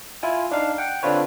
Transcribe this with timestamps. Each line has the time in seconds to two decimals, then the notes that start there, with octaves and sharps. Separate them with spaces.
0.23 E4 F4 G#5
0.51 D4 D#4 F5
0.78 F#5 G5
1.03 D3 C4 D4 F4 B4 C#5